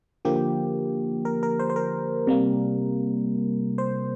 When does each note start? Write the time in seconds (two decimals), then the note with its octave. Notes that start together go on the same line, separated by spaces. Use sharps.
0.25 D3 F3 A#3 G4
1.25 A#4
1.43 A#4
1.60 C5
1.70 C5
1.76 A#4
2.27 C3 G3 A#3
3.78 C5